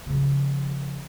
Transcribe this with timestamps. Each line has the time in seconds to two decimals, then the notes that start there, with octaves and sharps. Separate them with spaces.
0.06 C#3 F3